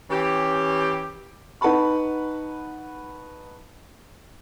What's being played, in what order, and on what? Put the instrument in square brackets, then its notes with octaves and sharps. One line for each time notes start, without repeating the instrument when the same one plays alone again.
[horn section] E3 C#4 G4
[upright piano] D#4 B4 F#5 A5 B5 C#6